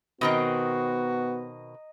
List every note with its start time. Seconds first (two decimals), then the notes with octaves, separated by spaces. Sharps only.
0.21 B2 D#3 B3 C4 F#4 D#5 A#5